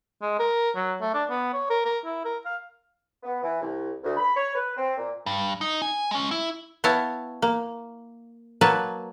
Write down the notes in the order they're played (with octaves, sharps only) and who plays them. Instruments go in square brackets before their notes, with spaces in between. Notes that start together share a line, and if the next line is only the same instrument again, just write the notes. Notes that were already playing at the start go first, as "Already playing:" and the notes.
[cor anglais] G#3
A#4
F#3
A3
D4
B3
C#5
A#4
A#4
E4
A#4
F5
[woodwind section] B3
E3
C2
D2
B5
C#5
B4
C4
A#2
[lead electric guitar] G2
D#4
G#5
G#3 C#4
E4
[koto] B3 E4 C#5 F5 A5
A#3
F#3 A#3 B4 C#5 F#5 A5